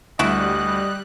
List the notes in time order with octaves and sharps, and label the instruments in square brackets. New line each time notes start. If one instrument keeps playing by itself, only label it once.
[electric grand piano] D2 [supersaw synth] G3 F#6 [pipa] E4 F#4 [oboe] D#5